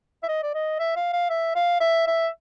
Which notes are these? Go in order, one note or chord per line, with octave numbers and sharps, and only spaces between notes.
E5
D#5
D5
D#5
E5
F5
F5
E5
F5
E5
E5